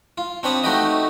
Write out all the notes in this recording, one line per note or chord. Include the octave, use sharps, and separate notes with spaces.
F4
C4 D4 C#5 B5 D#6
A3 D#4 F#4 G4 B4 D#5